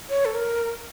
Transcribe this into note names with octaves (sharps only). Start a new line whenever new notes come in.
C#5
A4
A#4